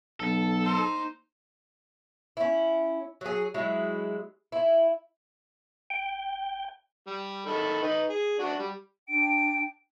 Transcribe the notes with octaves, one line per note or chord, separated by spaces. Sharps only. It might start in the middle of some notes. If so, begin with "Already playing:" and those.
B1 A4
A#3 D#4 C5
C#4 E4
F#3 G#4
F#3 G#3 E4
E4
G5
G3
D#3 A4 B5
D#4 B4
G#4
D4 F#4
G3
D4 G5 D7